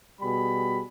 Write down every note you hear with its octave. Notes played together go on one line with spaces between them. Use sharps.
B2 G3 G#4 B5